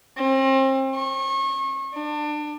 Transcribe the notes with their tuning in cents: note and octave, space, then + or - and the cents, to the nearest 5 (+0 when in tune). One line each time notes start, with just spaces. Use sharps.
C4 +35
C#6 -35
D4 +25